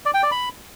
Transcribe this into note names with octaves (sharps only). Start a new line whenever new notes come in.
D5
G5
D5
B5